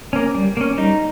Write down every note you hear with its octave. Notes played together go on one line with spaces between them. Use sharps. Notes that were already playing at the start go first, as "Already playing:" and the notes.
A#3 C#4
G3
A#3 C#4
G3 D#4